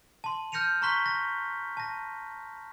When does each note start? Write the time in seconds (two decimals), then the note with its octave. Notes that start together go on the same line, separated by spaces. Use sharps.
0.24 A5 C6
0.52 F6 G6 A#6 C#7 D#7 F7
0.82 A#5 C6 C#6 F#6 B6 G7
1.06 A#6
1.77 A5 A#6